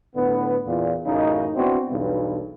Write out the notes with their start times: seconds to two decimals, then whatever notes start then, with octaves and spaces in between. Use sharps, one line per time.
0.15 A2 D3 B3
0.66 E2 A#2
1.06 A1 F#2 C#3 D#4
1.55 B3 C4 D4 E4 F#4
1.90 B1 E2 G2 B2